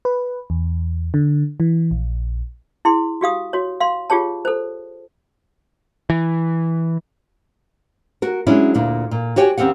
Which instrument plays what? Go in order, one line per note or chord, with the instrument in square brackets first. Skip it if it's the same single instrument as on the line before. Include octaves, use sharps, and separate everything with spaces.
[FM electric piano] B4
E2
D3
E3
A#1
[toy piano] E4 G#4 C6
F#4 G4 F5 D#6
F#4 C#5
F5 C6
F4 G4 G#4 C#5 A5
A4 C5
[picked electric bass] E3
[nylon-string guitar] F#4 A#4
F#3 G#3 C#4 D4 E4
D2 A#2 D4
A#2
F#4 G4 C#5 G5 G#5
D#2 C4 C#4 G4 F#5